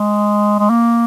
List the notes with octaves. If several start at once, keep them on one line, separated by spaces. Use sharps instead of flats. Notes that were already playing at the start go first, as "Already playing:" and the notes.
Already playing: G#3
G#3
A#3